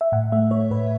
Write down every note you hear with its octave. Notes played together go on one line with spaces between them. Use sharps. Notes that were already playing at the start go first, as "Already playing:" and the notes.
E5
A2 F#5
A3 E5
A3 C#5
A2 B4